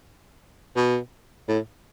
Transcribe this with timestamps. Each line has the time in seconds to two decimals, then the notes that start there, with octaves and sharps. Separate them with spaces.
0.76 B2
1.48 A2